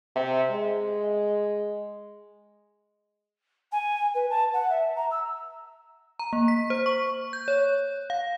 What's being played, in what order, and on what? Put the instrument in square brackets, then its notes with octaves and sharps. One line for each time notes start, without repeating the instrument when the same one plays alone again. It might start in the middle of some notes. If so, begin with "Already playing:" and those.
[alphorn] C3
G#3
[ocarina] G#5
B4
A5
F#5
E5
A#5
E6
[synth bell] A#5
A#3
B6
C5
C#6
G6
C#5
F5